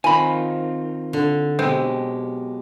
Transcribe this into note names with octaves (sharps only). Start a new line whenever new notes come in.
D#3 C4 D#4 F4 G#5 B5
D3
B1 B2 G#3 C4 G4